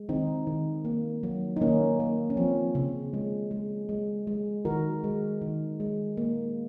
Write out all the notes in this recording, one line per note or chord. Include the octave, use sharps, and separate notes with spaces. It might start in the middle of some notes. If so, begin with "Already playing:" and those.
Already playing: G#3
D#3 C4 D#4
D#3
A#3
F#3
D#4
D#3 A#3 C#4
A#3
C#4
F3 C4
C#3
G#3
G#3
G#3
G#3
D#3 F#4 A#4
G#3
D#3
G#3
A#3